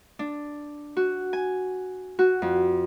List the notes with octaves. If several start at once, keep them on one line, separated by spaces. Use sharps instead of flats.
D4
F#4
G#5
F#4
F2